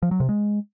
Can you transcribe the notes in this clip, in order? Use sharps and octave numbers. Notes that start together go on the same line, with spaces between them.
F3
F#3
C3
G#3